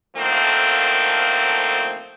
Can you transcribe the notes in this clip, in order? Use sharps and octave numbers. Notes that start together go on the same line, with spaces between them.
D3 D#3 F3 A3 A#3 C4